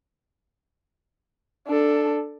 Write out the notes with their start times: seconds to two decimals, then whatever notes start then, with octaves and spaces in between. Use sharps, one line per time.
1.68 D4 A4